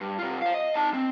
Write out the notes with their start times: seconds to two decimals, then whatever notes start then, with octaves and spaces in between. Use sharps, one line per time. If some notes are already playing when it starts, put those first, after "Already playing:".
0.01 G2
0.19 C3 F4
0.42 C5 F5
0.54 D#5
0.76 D#4 A5
0.94 C4